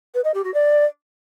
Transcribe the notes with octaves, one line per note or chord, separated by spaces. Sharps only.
B4
D#5
G4
F#4
D5